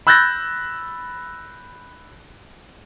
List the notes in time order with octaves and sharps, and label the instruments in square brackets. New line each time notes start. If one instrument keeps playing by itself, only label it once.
[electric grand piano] B5 E6 F#6 G6 A6 A#6